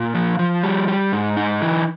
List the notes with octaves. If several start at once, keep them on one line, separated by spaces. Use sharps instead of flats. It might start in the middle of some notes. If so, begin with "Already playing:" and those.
Already playing: A#2
F3
F3
G3
G3
G#2
D#4
E3